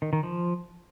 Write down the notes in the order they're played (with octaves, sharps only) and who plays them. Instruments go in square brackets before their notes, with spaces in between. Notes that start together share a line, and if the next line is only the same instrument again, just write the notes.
[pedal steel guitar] D#3
D#3
F3